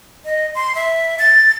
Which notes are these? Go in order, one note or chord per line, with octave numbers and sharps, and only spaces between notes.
D#5
C6
E5
A6